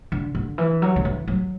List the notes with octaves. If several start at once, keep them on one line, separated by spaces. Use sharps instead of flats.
D3
D3
E3
F#3
D3
E3
F#3